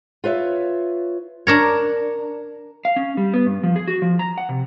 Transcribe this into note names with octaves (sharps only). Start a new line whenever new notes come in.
F4 B4 C#5 E5
D4 A#4 C#5
F5
C#4
G3
B3
G2
F3
G#4
F#4
F3
A#5
F#5
C3